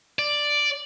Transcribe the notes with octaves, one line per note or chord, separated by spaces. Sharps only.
D5